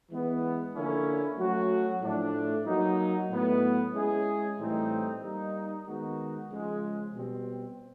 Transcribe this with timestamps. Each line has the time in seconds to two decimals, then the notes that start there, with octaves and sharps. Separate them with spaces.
0.10 E3 G#3 B3
0.74 D3 F3 A#3 C#4 E4
1.38 F#3 A3 C#4 F#4
2.02 A2 F3 A3 D4
2.66 F#3 A#3 D#4
3.30 A2 F#3 B3
3.94 G#3 C#4 E4 G#4
4.58 A2 E3 G3 C4 D#4
5.22 G3 A#3 D#4
5.86 D#3 G#3 B3 D#4 F#4
6.50 C#3 F3 G#3
7.13 B2 G3 C4